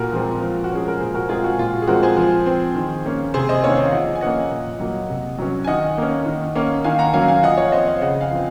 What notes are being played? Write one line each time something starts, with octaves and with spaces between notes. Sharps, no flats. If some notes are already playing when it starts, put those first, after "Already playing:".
Already playing: A#2 F#4 A#4
F3 G#3 C4
F3
F#4
G#3 C#4 G#4
A#4
A#2 G#4 C5
F#4 A#4
G#3 C4 F4 G#4
F#4
A#2 F4
F#4
G#4
F3 G#3 C4 F#4 A#4
G#4 C5
F3
C4
D#3
A#3 C#4
C3 G#4 C5
C5 D#5
D#3 A#3 C#4 C#5 F5
C#5 F5
F3 D#5 F#5
G#5
A#3 C#4 D#5 F#5
A#2
F#3 A#3
C3
F#3 C#4
G#5
D#3 D#5 F#5
A#3 C#4
D#3
A#3 C#4
D#3 F5 G#5
F#5 A#5
F#3 A#3 C#4 F5 G#5
F5 G#5
F3 D#5 F#5
C#5 F5
C4 C5 D#5
C#5 F5
C#3 D#5 F#5
F5 G#5
F3 C4